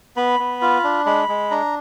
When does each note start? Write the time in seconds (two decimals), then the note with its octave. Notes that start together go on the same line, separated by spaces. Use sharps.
0.16 B3 B5
0.40 B3
0.61 F4
0.84 D4
1.06 G#3 B5
1.29 G#3
1.51 D4 A#5